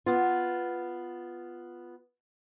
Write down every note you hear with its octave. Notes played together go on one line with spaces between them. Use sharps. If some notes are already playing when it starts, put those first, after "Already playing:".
B3 F4